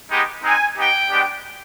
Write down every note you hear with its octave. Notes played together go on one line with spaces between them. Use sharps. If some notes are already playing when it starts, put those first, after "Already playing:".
G#3 B3 D#4 G4
G#3 C4 D#4 G#5
B3 D#4 G4 G5
G#3 B3 D4 G4